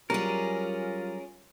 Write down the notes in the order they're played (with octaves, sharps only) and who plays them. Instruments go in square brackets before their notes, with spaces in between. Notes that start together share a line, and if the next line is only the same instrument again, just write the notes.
[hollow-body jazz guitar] F#3 G3 [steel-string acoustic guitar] C#4 G#4 [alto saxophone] F4 [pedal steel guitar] A#4 D5